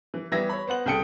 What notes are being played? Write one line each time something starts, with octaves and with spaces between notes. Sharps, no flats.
E3
E3 G3 B3 E5 G#6 A#6
C#5 B5
B3 C5 F#5 F#7
C2 C#3 A4 G5 D#6 C#7